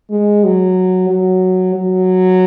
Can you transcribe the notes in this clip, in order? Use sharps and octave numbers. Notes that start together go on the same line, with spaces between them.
G#3
F#3
F#3
F#3